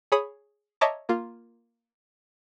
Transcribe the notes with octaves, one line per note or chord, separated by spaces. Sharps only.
G#4 C#5 B5 D#6
C#5 D#5 E5 A5 A#5 D6
A#3 F4